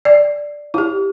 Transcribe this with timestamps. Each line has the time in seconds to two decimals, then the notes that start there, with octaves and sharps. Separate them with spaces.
0.05 D5
0.74 E4
0.78 G4